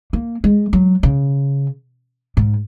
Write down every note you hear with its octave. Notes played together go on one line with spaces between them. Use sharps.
A#3
G#3
F#3
C#3
G#2